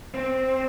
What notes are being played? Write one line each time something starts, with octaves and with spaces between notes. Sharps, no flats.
C4